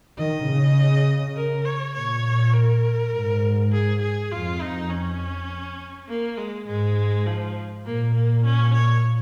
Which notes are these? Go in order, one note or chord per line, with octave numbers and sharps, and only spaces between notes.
D#3 D#5
C#3
A#4
C#5
A#2 C#5
A#4
G#2
G#4
G#4
F2 F4
D#4
C#4
A#3
G#3
G#2 G#3
F3
A#2 A#3
A#3
C#4
C#5